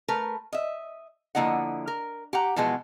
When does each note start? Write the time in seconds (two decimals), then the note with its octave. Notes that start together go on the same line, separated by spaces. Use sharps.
0.08 A3 A#4 B4
0.52 D#5 E5
1.35 D3 F3 A#3 E4 D#5 F#5
1.87 A#4
2.33 G4 F#5 A#5
2.56 B2 E3 F3 G#3 B3